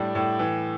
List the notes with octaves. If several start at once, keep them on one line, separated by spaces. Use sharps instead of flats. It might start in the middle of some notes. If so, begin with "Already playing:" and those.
Already playing: A2 G3 D4
A2
E3